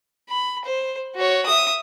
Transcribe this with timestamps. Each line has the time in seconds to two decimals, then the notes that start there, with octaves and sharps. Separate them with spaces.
0.29 B5
0.64 C5
1.15 F#4 C#5
1.46 E5 D#6